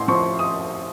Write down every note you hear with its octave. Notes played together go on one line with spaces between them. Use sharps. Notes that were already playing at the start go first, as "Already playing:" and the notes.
Already playing: A1 A2 C6
F3 C#6
D#6